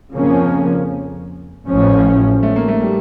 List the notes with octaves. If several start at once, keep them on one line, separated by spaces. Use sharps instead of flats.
F2 C#3 F3 A#3 C#4
A1 A2 F3 C#4
A3
A#3
A3
G3